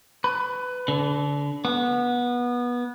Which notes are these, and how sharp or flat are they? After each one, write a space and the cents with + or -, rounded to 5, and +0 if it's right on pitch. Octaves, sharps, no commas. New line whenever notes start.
B4 +20
D3 -30
B3 -20